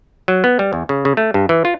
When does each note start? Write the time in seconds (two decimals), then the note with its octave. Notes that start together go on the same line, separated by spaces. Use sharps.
0.28 F#3
0.44 B3
0.59 G3
0.73 E2
0.89 C#3
1.05 C#3
1.17 A3
1.34 G2
1.49 E3
1.65 F4